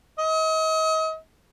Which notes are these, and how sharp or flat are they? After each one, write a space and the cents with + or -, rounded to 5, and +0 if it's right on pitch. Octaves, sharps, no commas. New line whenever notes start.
D#5 +35